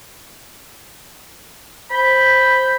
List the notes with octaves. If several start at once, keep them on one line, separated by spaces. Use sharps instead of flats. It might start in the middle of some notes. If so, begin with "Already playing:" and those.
C5 B5 G6